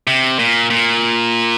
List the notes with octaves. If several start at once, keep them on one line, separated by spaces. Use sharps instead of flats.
C3
A#2
A#2